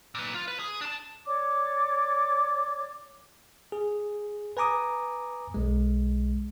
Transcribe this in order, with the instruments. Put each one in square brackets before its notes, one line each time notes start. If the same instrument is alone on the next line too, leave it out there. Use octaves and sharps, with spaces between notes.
[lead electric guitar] A#2 B4
F4
B4
G#4
D4 A5
[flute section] C#5 D5 D6
[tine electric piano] G#4
B4 G#5 A#5 D6 D#6
B1 G#3